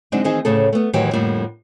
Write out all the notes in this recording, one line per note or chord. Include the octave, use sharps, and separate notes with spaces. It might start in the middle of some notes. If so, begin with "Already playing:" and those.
D3 F#3 G#3 C4 D4 D#4
D#3 E3 C4 D#4 G#4
D2 A2 C#3 G#4 A4
A3 B3
D2 A2 D#3 E3 F#3 G4
F2 A2 D3 G3 A#3